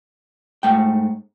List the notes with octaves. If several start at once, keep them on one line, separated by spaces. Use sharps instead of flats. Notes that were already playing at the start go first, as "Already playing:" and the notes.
G#2 A3 G5